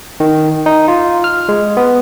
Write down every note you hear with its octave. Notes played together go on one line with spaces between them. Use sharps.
D#3
D#4
F4
F6
G#3
B3